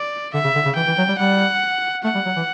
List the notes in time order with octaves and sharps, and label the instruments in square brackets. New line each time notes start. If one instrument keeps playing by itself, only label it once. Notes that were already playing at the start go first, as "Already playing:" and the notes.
Already playing: [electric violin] D5
[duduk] D3 [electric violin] E5
[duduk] C#3
D3
C#3
[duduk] E3 [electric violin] G5
[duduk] E3
F#3
G3
[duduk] G3 [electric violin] F#5
[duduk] A3 [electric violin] F#5
[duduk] G3
F#3
E3